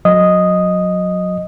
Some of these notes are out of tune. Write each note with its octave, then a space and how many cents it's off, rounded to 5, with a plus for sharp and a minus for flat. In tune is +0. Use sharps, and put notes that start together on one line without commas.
F#3 -25 D#5 +0 D#6 +0